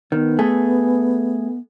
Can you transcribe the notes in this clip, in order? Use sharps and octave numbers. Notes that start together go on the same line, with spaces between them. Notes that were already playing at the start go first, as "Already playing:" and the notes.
D#3 B3
A3 G#4